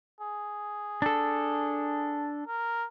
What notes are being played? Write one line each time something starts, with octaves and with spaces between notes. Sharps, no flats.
G#4
D4 A4
A#4